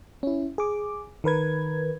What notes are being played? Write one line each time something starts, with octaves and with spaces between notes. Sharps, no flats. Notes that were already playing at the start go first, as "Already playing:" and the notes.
C#4 E4
G#4 D6
D#3 A#4 B4 G#6